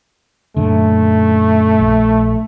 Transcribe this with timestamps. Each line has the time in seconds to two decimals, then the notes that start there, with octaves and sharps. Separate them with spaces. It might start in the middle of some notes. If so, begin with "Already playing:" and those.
0.57 F#2 A#2 D3 A3
1.79 A#1